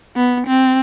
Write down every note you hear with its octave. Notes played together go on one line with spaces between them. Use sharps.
B3
C4